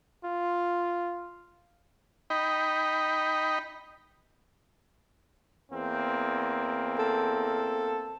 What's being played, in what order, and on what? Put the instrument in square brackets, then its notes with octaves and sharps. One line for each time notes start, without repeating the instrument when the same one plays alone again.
[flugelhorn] F4
[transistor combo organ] D#4 D#5 G5 B5
[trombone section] E2 A#3 C4
[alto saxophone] A4